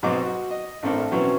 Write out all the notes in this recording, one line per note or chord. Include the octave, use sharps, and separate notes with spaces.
G#2 B2 F#3 C4 D#5 D6
F#4
D#5
A1 A3 C4 D4 A4 A#4
B2 E3 F#3 C4 C#4